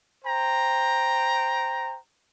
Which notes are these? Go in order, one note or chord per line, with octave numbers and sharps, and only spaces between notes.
C5 G5 A#5